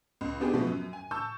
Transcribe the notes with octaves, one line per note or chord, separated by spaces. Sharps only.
C#2
B3 D4 G4 G#4
B2 F3 A3 B3
F#2
G#5
A5 C#6 E6 G6